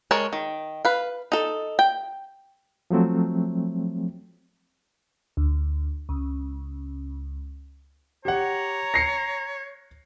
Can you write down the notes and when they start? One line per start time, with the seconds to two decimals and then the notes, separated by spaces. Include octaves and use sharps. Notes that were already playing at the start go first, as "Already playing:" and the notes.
0.11 G#3 A#4 C#5 A5
0.33 D#3
0.85 B4 F5
1.32 D#4 A4
1.79 G5
2.90 F3 F#3 A3 C4
5.37 D2
6.09 C#2
8.25 G4 C#5 F#5 A#5
8.94 A#6 C7 C#7